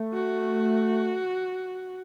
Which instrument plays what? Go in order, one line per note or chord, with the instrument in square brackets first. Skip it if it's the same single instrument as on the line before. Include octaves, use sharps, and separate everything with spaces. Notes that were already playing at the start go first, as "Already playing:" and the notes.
Already playing: [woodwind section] A3
[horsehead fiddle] F#4